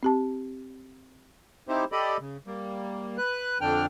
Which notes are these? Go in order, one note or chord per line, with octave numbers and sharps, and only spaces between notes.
C4 G4 A5
C4 D#4 E4 G4 C5
G4 A4 D5 D#5 B5
C#3
G3 A#3
B4 F#6
F2 D3 D4 G5 F6